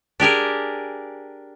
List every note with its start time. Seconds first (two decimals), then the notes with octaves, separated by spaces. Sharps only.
0.20 D4 G4 G#4 A#4